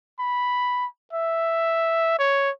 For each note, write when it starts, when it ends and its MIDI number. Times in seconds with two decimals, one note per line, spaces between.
0.19 0.86 83
1.13 2.16 76
2.19 2.50 73